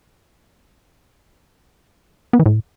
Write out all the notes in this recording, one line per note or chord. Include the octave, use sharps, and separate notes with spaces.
B3
E3
A2